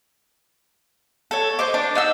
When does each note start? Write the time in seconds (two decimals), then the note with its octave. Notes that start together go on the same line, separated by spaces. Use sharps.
1.31 A4 C#5
1.59 C5 D#5 D6
1.74 D4
1.95 D#4 F#5 E6